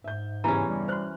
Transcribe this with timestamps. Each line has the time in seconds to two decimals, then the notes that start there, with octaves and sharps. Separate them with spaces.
0.04 G#2 E5 G6
0.44 E2 G2 C#3 E3 C#4 A#5
0.68 G3
0.88 F#4 C5 F6 F#6